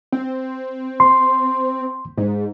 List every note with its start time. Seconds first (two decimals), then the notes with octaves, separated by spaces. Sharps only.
0.12 C4
1.00 C6
2.18 G#2